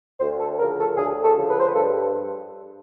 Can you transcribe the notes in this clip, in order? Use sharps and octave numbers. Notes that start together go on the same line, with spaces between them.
D2 C5
A4
C#3 F3 A#4
A4
D2 G#4
A4
C#3 F3
B4
C5
B4
G2 A4